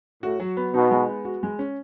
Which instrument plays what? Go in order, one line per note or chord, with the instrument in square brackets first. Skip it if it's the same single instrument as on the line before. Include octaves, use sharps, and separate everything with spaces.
[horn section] A2 [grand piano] F#4
[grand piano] F#3
B3
[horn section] B2 [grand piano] D#4
[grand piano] G#3
B3
F#4
G#3
C#4